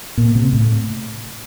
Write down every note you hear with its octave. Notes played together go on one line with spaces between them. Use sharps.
A#2
C3
A2